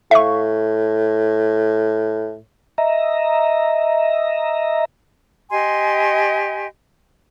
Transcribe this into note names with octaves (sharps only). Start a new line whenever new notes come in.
A2 E5 F5 C#6
D#5 E5 A#5
G4 D#5 G#5 C6